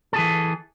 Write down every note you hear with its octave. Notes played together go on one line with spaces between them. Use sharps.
E3 G#4 A4